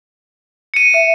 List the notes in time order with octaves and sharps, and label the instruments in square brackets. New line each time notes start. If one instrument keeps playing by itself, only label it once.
[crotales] C#7 D#7
[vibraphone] E5